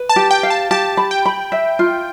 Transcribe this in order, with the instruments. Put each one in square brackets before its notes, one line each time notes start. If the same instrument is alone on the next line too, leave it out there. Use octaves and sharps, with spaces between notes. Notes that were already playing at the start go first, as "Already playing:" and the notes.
Already playing: [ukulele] B4
[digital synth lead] A5
[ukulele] G4
[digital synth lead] G5
[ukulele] F5
[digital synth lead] A5
[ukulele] G4 [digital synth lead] A5
[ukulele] B5
[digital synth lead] G5
[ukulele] B5
E5
F4